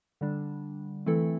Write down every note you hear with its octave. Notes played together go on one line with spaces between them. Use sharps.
D3 G3 D4
E3 A3 C4 E4 A4